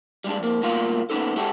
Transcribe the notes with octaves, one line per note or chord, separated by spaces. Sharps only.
G3 G#3 D4
F2 A#3
D2 G2 B2 A#3 F4 F5
D#2 B3 C#4 D#4 A4
G#3 E4 F#4 G4 A4